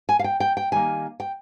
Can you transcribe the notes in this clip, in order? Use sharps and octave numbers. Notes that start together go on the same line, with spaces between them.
G#5
F5
G5
G5
G5
D#3 G3 A#3 G#5
G5